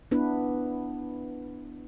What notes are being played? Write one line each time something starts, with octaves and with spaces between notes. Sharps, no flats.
B3 D4 E4 B4